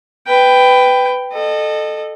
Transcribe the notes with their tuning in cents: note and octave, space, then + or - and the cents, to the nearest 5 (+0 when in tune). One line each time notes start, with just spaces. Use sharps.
B4 +15 G5 +0
A4 +0 D#5 -30